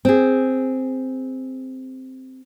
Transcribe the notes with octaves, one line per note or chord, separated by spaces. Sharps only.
C4 G#4